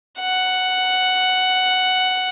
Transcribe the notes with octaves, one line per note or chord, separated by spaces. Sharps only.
F#5